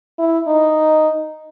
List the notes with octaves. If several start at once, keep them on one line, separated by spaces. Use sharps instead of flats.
E4
D#4